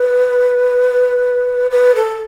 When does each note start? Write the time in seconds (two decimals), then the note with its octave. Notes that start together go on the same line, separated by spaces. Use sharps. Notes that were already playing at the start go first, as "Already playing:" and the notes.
Already playing: B4
1.71 B4
1.95 A4